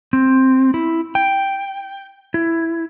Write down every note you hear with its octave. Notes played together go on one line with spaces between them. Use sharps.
C4
E4
G5
E4